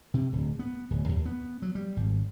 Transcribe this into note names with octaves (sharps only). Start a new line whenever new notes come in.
C3
D1
B3
D1
D#2
B3
F#3
G3
G#1